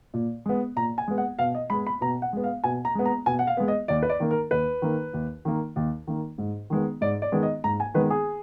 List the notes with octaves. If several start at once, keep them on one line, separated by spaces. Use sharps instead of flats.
A#2
G#3 B3
A#2 A#5
G#5
G#3 B3
F#5
B2 F5
D#5
G#3 B3 B5
B5
B2 A#5
F#5
G#3 B3
F5
B2 G#5
A#5
G#3 B3
A#5
B2 G#5
F#5
F5
G#3 B3
D#5
D#2 D5
B4
D5
D#3 A#3
A#4
D#2 B4
D#3 A#3
D#2
D#3 A#3
D#2
D#3 A#3
G#2
D#3 G#3 B3
G#2 D5
D5
D#3 G#3 B3
D#5
G#2 A#5
G#5
D#3 G#3 B3 B4
G#4